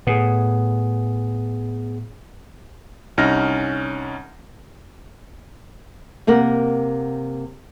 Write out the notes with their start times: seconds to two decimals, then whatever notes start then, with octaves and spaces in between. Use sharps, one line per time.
0.07 A2 B3 G#4
3.18 C2 C#4 D#4 F6 A#6
6.27 C3 A#3 A#4 F#5